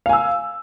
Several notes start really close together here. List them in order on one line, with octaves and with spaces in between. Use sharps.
F5 G#5 E6